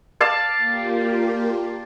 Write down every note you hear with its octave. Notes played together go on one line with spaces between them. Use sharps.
D5 F5 A5
A#3 F4 G4